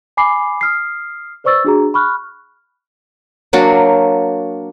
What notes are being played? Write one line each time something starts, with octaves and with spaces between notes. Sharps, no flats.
G#5 B5 D6 C7
D#6 F6 C7
B4 C5 D5 C#6 E6 A6
D4 F#4 G#4 A#5
B5 C#6 F6 F#6
F#3 A#3 D4 F#4